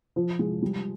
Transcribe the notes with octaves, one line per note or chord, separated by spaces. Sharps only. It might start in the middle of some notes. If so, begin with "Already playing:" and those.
F3
G#3
G3